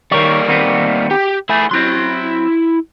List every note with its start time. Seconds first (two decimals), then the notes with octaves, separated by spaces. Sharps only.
0.11 D#3 G3 A#3 C#5
0.48 D#3 B3 C4
1.11 G4
1.49 A3 E4 G#4
1.71 F#3 C4 E4 C6